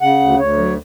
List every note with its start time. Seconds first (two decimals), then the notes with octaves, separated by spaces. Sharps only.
0.01 C#3 F#5
0.20 D2
0.39 D2 C#5
0.58 F#3